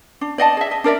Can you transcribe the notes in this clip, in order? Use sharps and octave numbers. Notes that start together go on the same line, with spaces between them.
D4
D5 D#5 F#5 A5
G#4 E5
D#5
D4 A#4 D5 E5